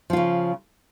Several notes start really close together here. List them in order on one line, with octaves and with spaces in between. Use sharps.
F3 F4 C#3